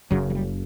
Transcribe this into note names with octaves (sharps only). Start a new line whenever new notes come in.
F#1 F#2 C#3 F#3
F#3
G3